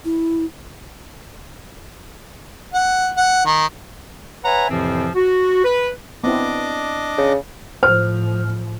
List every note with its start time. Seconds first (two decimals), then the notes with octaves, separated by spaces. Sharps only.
0.05 E4
2.74 F#5
3.17 F#5
3.46 D#3
4.45 B4 C#5 E5 F#5 G#5 A#5
4.70 F2 A2 C3 E3 F3 C4
5.15 F#4
5.64 B4
6.24 B3 C4 D4 E4 D#5 D6
7.18 C#3
7.83 A2 F3 C5 F6